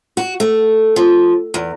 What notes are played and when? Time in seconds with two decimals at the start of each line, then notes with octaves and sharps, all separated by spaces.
0.17 F#4
0.40 A3
0.96 F3
1.54 E2